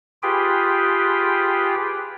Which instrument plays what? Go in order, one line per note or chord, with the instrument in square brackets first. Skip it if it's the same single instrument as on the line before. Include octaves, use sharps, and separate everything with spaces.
[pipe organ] F4 G4 G#4 B4 G5